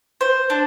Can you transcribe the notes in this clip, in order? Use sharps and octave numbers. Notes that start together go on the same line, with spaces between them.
C5
D4